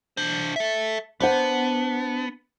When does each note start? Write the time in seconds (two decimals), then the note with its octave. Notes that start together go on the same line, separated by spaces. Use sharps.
0.17 D4 C5
0.56 A4 E5
1.20 B3 D4 C5 F#5